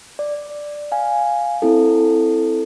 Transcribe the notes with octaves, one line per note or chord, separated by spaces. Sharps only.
D5
F5 G#5
C4 E4 A4